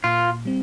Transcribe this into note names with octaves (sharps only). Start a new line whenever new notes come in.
A#2 F4
G3 C4